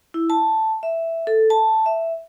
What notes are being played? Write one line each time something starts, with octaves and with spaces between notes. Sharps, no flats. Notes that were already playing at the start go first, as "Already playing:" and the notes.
E4
A5
E5
A4
A5
E5